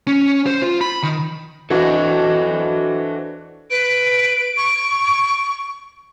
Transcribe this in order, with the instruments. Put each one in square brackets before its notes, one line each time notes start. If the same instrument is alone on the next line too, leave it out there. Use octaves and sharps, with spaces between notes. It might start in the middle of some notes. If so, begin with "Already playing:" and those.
[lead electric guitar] C#4
C5
F4
B5
D#3
[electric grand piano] E3 D4 F#4 [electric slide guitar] A4 C5 D#5
[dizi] B4 [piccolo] D7
[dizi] C#6